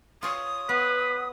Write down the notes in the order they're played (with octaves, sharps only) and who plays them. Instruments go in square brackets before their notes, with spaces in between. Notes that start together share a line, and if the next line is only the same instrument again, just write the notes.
[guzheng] F4 C#5 [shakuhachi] D#6
[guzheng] B3 [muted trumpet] B4